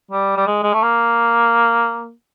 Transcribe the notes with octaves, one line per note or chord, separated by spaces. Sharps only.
G3
G3
G#3
G#3
A3
A#3